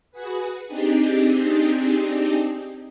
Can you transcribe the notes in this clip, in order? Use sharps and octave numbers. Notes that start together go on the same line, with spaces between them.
F#4 G#4 B4
C4 D4 D#4 G4 G#4